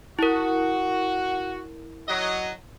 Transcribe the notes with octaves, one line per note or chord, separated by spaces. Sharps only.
E4 F#4 A#4
F#3 D#5